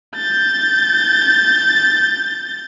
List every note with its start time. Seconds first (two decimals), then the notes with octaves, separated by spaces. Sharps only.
0.16 G6 A6